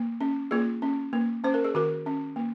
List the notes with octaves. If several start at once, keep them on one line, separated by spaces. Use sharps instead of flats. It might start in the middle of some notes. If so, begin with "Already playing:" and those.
Already playing: A#3
C#4
A#3 F4 G#4
C#4
A#3
C#4 C5
A#4
G#4
D#3 F#4 A#4
C#4
A#3